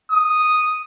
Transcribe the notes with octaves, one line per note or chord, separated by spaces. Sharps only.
D#6